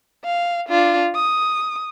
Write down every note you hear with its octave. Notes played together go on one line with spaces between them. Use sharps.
F5
D4 F4
D#6